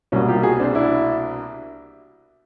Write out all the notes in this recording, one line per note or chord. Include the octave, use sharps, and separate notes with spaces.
C2 B2 G3 A#3 C#4
F4 G4
F#4 G#4
C4 D4
D4 E4